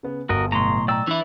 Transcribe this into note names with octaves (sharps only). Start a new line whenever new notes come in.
C#3 B3
G1 F#4 A#4 D#5
B1 A2 A#5 C6
D5 G5 A#5 E6
E3 D4 E4